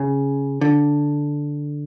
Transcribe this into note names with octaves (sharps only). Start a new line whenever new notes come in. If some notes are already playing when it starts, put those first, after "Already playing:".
Already playing: C#3
D3